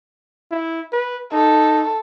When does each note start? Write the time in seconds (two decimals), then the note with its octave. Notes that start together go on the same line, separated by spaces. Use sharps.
0.51 E4
0.92 B4
1.32 D#4 A4